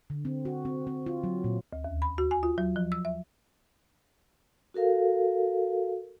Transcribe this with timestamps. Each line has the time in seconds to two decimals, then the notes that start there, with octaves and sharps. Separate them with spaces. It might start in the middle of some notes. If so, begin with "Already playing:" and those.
0.10 D3
0.25 C4
0.45 F#4
0.65 C4
0.87 C4
1.06 F4
1.24 F#3
1.44 A#2
1.73 D2
1.84 D#2
2.02 B5
2.18 F#4
2.31 G#5
2.43 F4
2.58 F#3
2.76 F3
2.92 E6
3.05 E5
4.74 F#4 A4 A#4 F5